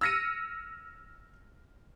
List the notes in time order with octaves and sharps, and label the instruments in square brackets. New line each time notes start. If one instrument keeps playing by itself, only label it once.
[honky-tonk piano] E6 F6 A#6 C#7 D#7